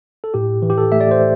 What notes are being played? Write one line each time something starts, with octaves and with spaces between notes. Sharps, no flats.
A4
A2 G4
E3
G4
A4
A3 E5
D5
C5